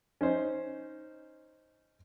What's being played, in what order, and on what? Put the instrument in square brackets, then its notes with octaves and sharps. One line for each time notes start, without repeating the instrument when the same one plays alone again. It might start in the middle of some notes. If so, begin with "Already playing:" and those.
[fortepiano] C#4 D#4 C5